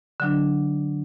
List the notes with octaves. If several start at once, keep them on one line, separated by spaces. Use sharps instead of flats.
D3 F#3 D4